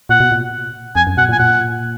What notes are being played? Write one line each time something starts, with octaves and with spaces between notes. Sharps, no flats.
A#2 F#5
B2
A#2
F2 G#5
F#2
B2 F#5
A#2
G#5
A#2 F#5